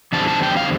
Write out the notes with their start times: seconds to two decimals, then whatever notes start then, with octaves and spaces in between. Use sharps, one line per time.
0.13 E2 D3 G3 C4 A5
0.28 A5
0.43 G5
0.57 F5